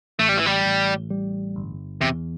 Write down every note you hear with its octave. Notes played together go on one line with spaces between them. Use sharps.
A1 A3
G3
E3
G3
A1
G3
G1
E2 C3